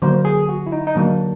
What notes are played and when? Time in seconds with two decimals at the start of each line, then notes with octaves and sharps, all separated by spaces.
0.02 D3 F#3 A#3 C5
0.25 G#4
0.49 F#4
0.67 E4
0.72 D#4
0.87 D#4
0.95 D3 F#3 A#3 D4